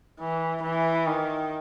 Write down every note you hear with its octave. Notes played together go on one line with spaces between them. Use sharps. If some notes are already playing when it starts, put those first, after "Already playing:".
E3
E3
D#3